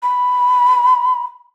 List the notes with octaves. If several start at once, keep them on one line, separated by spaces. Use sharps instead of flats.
B5